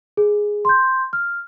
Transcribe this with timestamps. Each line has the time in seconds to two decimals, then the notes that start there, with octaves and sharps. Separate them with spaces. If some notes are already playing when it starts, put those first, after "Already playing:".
0.17 G#4
0.65 C6 G6
1.13 F6